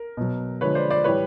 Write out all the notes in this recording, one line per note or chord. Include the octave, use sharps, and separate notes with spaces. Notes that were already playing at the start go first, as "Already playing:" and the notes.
Already playing: A#4
B2 F#3
D3 F3 G#3 B4 C#5
C5 D5
C5 D5
A2 E3 G3 B4 C#5